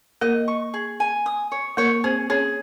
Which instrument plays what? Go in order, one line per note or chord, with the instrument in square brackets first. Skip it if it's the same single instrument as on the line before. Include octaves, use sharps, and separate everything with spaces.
[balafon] A#3 A#4 [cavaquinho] D#5
[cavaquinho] C#6
G#4
G#5
D#6
C#5
[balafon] A#3 A#4 [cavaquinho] C#5
[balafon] C4 C5 [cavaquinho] G#4
[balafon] C#4 C#5 [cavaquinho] G#4